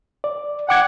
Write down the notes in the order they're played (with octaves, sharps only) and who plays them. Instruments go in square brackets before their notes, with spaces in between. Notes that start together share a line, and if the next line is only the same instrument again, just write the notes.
[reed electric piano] D5
[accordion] F#5 [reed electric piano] G5 D6 G#6